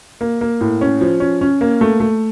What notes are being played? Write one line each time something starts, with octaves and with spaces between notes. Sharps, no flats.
A#3
A#3
A2
C#4
F3
C#4
C#4
A#3
A3
A3